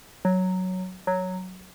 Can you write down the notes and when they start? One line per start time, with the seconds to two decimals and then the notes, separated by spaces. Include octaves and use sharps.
0.25 F#3
1.07 F#3